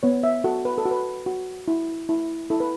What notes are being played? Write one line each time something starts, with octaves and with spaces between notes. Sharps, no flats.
B3 C#5
E5
F#4 A4
B4
A4
F#4
B4
F#4
E4
E4
E4 A4
B4